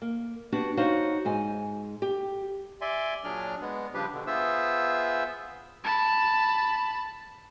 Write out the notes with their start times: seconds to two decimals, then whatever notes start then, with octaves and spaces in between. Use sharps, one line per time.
0.02 A#3
0.52 B3 D4 F#4 G4
0.77 D#4 F#4 C5 C#5 F5
1.25 G#2 G#4 G#5
2.02 G4
2.81 D5 E5 G#5 C6
3.24 A#2 F#3 D4 G#4 D5 F6
3.61 G#3 B3
3.94 C#3 F3 G3 D4 G4 B4
4.13 B2 D3
4.27 B3 F4 G#4 C5 E5 E6
5.84 A5 B5